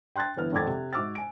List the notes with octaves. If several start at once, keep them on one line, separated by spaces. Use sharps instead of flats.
G5 C6 F#6 G#6 A6
G1 E3 B3 F6
G#1 F2 C4 D6 G#6 A6
C3
G#2 F#4 D6 E6 F6 A6
G#5 D7